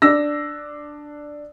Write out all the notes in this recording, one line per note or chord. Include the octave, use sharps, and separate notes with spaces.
D4 E6 A#6